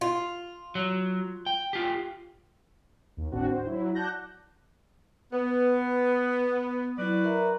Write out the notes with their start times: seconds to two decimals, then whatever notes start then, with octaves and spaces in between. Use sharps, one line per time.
0.01 F4
0.75 F#3
1.46 G5
1.73 F4 G4
3.17 D#2
3.32 G#1 A2 C4 D4 F#4
3.52 C5
3.66 F#3 E4
3.95 D5 F#5 A5 F#6 G6 A#6
5.32 B3 B4
6.98 F#3 E4 F#4 B4 D5
7.24 A#4 E5 A#5